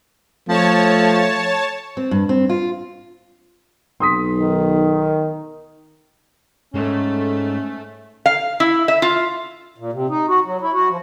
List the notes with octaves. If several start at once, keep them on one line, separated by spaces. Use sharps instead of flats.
F3 A3 C#5 A5
C4
G2
C4
F4
B1 C6 D#6 B6
D#3
G#2 A3 C#4
F5
E4
E5
F4
A#2
C3
D#4
F#4
F#3
E4
F#4
F3